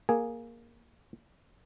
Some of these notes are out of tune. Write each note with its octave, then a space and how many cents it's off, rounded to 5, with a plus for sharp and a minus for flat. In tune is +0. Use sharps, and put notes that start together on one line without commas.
A#3 +0 G#4 +0 G#5 +0